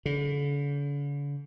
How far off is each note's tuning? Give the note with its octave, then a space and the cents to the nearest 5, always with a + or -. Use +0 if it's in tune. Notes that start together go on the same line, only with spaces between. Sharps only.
D3 -45